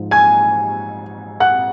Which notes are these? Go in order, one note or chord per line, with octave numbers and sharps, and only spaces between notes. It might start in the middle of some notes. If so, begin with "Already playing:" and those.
Already playing: G#2 F3
G#5 G#6
F#5 F#6